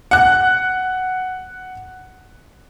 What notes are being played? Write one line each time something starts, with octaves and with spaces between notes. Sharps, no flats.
F#5 F#6